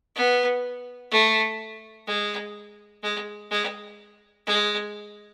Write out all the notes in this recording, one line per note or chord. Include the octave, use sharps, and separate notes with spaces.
B3
A3
G#3
G#3
G#3
G#3